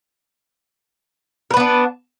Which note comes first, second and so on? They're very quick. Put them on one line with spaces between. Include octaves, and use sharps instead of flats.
A#4 B4 B3 D4